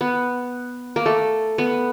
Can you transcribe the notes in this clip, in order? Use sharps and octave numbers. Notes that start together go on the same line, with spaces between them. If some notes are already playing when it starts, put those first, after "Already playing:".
B3
A#3
A3
B3